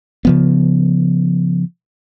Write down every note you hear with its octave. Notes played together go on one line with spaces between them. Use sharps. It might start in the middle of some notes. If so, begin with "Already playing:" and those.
C#3 F3 B3